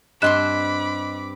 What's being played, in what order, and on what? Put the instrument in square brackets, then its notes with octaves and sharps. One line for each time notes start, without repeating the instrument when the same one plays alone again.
[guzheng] G2 C4 C6 [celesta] D#5 F#6 E7 [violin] B5 D6